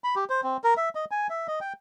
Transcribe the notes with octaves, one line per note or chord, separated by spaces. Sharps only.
B5
G4
C5
C4
A#4
E5
D#5
G#5
E5
D#5
G5